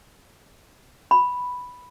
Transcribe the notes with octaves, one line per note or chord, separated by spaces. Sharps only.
B5